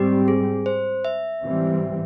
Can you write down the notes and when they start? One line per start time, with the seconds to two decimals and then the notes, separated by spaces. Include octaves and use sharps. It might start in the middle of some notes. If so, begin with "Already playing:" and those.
Already playing: G#2 G3 C4 G4
0.28 G#4
0.66 C5
1.05 E5
1.43 G#2 E3 G3 C4